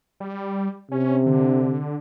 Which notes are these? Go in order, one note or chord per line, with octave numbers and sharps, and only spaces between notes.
G3
C3 C#4
D3